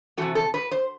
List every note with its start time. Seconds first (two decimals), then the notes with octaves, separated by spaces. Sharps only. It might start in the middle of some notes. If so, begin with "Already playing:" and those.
0.17 C3 E3 A3 F#4
0.35 A4
0.54 B4
0.71 C5